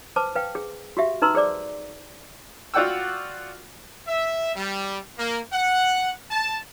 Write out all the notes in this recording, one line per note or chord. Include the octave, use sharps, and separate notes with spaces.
B4 C5 A5 D6
B4 F5 G5
G#4
F#4 G4 E5 F5
D#4 B4 A#5 C6 E6
G#4 C5 D5 D6
F4 F#4 D5 F#5 G5 E6
E5
G3
A#3
F#5
A5